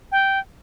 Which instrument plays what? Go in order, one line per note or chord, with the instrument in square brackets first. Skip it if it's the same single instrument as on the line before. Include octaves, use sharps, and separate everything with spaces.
[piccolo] G5